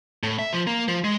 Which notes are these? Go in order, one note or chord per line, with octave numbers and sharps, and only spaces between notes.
A2
E5
F3
A#3
F3
G#3